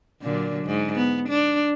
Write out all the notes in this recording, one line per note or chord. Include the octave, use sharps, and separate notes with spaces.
A#2 D3 F#3
G#2
B3
D4